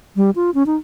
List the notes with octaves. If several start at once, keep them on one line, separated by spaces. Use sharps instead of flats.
G3
F4
C#4
D#4